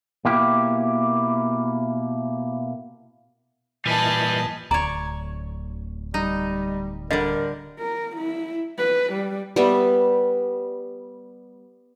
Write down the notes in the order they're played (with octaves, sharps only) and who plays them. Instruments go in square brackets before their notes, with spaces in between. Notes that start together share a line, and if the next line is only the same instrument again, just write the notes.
[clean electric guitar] B2 A#3 E4 G4
[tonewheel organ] A#2 E3 D#5 [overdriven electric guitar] G3 B4 [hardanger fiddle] G#5 A5
[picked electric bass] D1 D2 [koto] C#5 D5 [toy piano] A#5
[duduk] G3 [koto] D#4
[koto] D3 G3 [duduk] A#4 [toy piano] D#5
[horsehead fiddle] A#4
E4
B4
G3
[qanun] G3 B3 E5